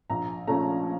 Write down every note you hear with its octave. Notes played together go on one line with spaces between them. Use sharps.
A#1 A#5
A#2 F3 A3 C#4 A#5